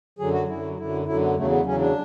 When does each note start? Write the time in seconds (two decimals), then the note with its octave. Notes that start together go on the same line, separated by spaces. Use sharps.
0.19 F#2 D3 F#3 G#4
0.33 F#4
0.48 F#2 D3 F#3 E4
0.77 F#2 D3 F#3 E4
1.06 F#2 D3 F#3 E4
1.21 B3
1.36 E2 C#3 F#3 A3
1.51 B3
1.65 E2 C#3 F#3 C#4
1.80 D4